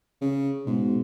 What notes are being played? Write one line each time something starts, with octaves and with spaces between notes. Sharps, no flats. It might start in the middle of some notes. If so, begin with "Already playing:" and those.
C#3
G#2 B2